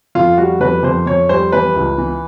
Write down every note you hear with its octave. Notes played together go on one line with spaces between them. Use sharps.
F2 F4
G3 F#4
F2 B4
F2 C5
F2 C#5
G3 C5
E3 B4
C#2
E3